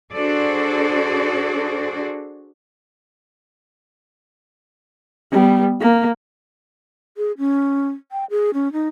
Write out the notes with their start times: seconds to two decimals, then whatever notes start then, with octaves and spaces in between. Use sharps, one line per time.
0.14 D4 F#4 G#4 A4 C5 D5
5.31 G3 B3
5.81 A#3
7.17 G#4
7.38 C#4
8.12 G5
8.30 G#4
8.54 C#4
8.73 D#4